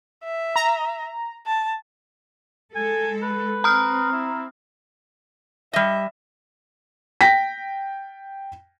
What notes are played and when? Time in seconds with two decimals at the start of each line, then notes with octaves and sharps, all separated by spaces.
0.24 E5
0.56 A#5
1.47 A5
2.75 G#3 A4 G#5
3.22 B4
3.64 C4 A#5 D#6 F6
4.13 E4
5.73 G3 D#5 E5
7.21 G5 A#6 B6